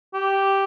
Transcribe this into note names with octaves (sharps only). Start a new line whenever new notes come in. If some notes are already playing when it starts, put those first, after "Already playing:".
G4